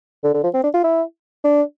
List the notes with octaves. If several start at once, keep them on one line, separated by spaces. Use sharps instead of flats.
D3
D3
F3
C4
D4
F4
E4
D4